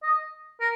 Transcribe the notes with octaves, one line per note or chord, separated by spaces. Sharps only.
D#5
A#4